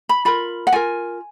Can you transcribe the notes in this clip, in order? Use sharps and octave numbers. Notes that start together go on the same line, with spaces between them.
B5
F4 A#4 B5
F#5
F4 A#4 G#5